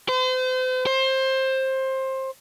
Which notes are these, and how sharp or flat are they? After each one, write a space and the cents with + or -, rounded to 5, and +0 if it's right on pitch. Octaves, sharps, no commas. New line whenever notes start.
C5 -40
C5 +20